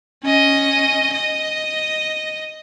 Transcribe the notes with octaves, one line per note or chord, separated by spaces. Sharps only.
C#4 D#5
D#5